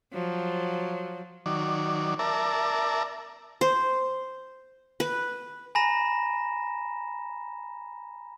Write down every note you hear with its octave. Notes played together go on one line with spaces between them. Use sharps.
F3 F#3
D#3 F#3 D5
A#4 D5 E5 A5 A#5
C5
B4
G#5 A#5 B5 A#6 E7